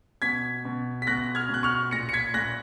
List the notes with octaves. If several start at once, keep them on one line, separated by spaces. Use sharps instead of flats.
B2 G#6 B6
B2
B6
B2 F#6 A#6
F6 G#6
B2 F#6
C#6 F6
A#2 A#6 C#7
C#7
G#6 B6
A#2 F#6 A#6